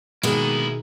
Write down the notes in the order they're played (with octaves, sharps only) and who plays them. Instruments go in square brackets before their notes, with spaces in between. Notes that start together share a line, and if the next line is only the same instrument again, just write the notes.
[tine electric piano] B2 G#4 [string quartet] D#3 [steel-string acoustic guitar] G#3 B3 [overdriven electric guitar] A#3 E4